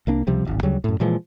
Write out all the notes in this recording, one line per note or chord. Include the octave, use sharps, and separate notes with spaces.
C2 A#3 D4
C#2 C3 F3 G3
D1 G#1
D2 C#3 F#3 G3
F#2 A2
A#2 E3 F3 G#3